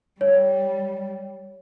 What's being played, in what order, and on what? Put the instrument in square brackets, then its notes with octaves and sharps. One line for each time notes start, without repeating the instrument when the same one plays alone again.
[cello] G3 [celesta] C#5